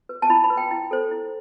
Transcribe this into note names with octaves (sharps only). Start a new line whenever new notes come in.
B4
A5
E4 B5
B5
B4
G5
E4
A4 C5
E4